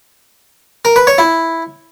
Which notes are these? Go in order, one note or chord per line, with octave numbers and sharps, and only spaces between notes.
A#4
B4
C#5
E4